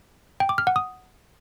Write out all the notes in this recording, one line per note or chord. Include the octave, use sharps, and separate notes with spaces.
G5
D6
F6
F#5
D#6